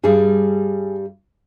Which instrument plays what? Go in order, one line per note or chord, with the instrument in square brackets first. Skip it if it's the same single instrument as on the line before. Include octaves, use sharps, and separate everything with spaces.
[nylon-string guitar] G2 G3 G#4